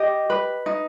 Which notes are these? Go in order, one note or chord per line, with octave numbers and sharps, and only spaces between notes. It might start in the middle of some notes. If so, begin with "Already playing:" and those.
Already playing: G4 D#5
B4
D#4